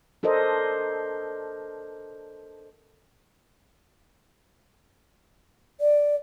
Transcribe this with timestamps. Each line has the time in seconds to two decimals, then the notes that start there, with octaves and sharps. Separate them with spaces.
0.23 D4 A4 A#4 C5 D#5
5.81 D5